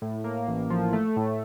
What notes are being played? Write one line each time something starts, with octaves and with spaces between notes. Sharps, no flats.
A2
A#3
A1
F3
A3
A2